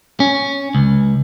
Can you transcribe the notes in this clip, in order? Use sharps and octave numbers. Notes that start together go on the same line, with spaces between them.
C#4
C#2